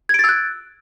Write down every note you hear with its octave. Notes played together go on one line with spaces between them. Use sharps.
E6 F#6 G#6 A6 D7